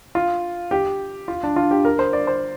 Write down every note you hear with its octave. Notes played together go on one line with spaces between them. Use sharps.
F4
G4
F4
D4
F4
G4
A#4
C5
D5
C5